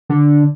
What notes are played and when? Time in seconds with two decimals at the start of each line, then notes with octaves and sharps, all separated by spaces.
0.10 D3